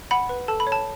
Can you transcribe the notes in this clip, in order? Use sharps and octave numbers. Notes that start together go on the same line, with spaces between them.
F#5 B5
B4
A4 A5
B5
C#5
A5